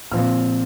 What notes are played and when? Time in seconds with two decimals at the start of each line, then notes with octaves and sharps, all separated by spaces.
0.12 A#2 F3 C4 F6